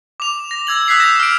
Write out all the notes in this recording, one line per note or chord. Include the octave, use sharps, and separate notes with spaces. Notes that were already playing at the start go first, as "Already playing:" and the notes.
D6 F7
A#6
E6 G#6 F#7
D#6 E6 F#6 G#6 B6 C7
E6 G6 A#6 E7
F6 D7